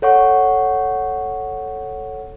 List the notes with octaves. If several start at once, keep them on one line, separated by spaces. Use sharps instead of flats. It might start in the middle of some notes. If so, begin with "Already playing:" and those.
A4 C#5 F#5 C#6